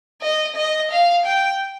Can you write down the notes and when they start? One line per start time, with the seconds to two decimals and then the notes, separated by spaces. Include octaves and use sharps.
0.22 D#5
0.56 D#5
0.91 F5
1.25 G5